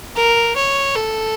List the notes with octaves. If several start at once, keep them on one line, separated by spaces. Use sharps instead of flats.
A#4
C#5
A4